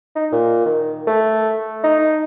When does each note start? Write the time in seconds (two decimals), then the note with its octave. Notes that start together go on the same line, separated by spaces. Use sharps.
0.15 D#4
0.32 A#2
0.65 D#3
1.07 A3
1.84 D#4